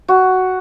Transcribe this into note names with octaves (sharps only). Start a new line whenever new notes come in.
F#4